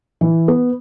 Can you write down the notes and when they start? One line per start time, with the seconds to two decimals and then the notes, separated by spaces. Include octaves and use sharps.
0.21 E3
0.48 B3